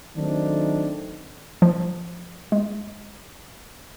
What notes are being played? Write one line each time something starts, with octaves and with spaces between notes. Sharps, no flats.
D#3 F#3 A3 C4 D4 D#4
F3
G#3